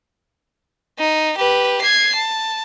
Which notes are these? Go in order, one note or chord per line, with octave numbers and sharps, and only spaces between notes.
D#4
G4 B4
G#6 C7
A5